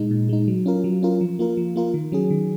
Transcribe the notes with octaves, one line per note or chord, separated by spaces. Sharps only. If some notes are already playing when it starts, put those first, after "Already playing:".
Already playing: A#2 G#3 D#4
A#2
G#3 D#4
F#3
C#4 F4 A#4
F#3
C#4 F4 A#4
F3
A#3 F4 A#4
F3
A#3 F4 A#4
D#3
F#3 C#4 G#4
D#3